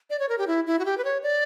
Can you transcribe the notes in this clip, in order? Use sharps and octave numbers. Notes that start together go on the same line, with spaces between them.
D5
C#5
A#4
G4
E4
E4
F#4
G4
B4
C#5
D5